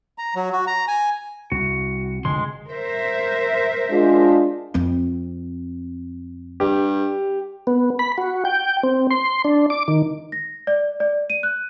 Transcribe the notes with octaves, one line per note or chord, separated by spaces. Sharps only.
A#5
F#3
F#4
A#5
G#5
C2 F#4
F1 D3 F3 G#3 C6
A#4 C5 E5
G#3 D4 F4
F2 C4
G2 G4
B3
B5
F#4
G5
C4
C6
D4
D6
D#3
A#6
D5
D5
D#7
F#6